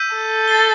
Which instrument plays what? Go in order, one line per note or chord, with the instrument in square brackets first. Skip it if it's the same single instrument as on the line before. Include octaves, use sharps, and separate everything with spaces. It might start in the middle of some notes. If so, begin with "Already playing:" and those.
Already playing: [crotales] E6 G6 B6 D#7
[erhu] A4
[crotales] A6 C7 D#7 G7